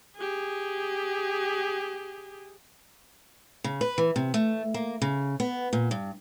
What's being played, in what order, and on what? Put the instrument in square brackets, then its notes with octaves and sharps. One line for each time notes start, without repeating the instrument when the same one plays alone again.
[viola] G4 G#4
[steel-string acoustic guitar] C#3
B4
E3
C3
A3
A#3
C#3
B3
A#2
G2